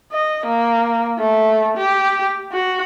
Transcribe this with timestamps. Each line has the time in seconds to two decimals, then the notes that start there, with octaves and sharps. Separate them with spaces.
0.12 D#5
0.46 A#3
1.18 A3
1.78 G4
2.53 F#4